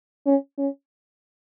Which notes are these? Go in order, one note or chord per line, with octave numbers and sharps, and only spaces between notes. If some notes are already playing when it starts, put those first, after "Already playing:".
C#4
C#4